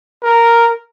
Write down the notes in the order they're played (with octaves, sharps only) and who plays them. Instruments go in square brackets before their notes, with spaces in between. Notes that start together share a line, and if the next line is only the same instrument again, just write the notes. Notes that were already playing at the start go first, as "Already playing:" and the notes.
[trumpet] A#4